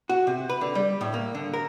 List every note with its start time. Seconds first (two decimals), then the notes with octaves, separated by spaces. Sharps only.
0.09 F#4
0.27 C3
0.50 B4
0.61 D3
0.75 G3
1.01 A2
1.14 A#3
1.35 D3
1.53 A#4